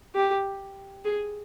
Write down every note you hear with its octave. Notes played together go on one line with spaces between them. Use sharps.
G4
G#4